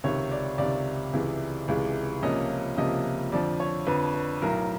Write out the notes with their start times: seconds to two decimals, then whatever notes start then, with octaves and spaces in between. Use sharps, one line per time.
0.04 C#2 C3 D#3 C#5
0.31 D5
0.58 C#2 C3 D#3 D5
1.13 C#2 C3 E3 G#3
1.68 C#2 C3 E3 G#3
2.23 C#2 C3 F3 A#3 C#4 D#5
2.77 C#2 C3 F3 A#3 C#4 D#5
3.32 F2 D3 F3 D5
3.60 C#5
3.87 F2 D3 F3 B4
4.14 B4
4.42 B1 A2 F#3 A#4